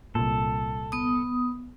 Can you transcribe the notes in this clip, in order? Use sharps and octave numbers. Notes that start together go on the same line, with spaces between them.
C2 A#2 A4
B3 D#6